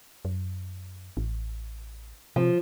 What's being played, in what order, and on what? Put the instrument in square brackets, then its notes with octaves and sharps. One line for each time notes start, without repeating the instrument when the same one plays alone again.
[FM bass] F#2
A1
[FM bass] C3 [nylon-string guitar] F3